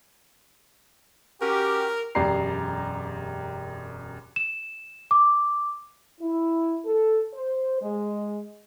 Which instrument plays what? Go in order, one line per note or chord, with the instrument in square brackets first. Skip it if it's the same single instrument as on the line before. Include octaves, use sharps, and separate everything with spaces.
[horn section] C#4 F#4 G4 [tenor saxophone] A#4
[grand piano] E1 F#2 G4 D5 A#5 C7
[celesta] E7
D6
[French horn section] E4
A4
C5
G#3